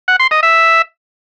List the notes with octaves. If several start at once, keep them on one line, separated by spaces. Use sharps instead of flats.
F#5
C6
D#5
E5